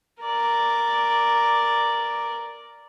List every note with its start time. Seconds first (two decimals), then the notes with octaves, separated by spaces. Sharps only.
0.22 A#4 D5